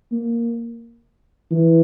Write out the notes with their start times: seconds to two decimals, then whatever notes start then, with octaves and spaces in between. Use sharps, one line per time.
0.12 A#3
1.51 E3